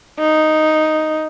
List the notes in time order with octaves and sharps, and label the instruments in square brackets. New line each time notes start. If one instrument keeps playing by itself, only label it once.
[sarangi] D#4